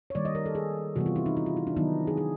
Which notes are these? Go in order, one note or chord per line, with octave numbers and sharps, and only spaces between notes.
C#5
D#3 G3 A#3 D5
D#5
A#4
A4
G#4
C3 E3 G3 B3 F#4
F4
E4
D#4
E4
F4
E4
D4
D#3 F#3 B3 D#4
G#4
G#4